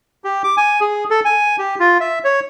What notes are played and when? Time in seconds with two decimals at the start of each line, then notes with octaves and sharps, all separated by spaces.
0.24 G4
0.44 D6
0.57 G#5
0.80 G#4
1.10 A4
1.25 G#5
1.58 G4
1.80 F4
2.00 E5
2.24 C#5